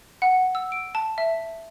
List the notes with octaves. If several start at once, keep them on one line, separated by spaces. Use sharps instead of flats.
F#5
E6
D7
A5
E5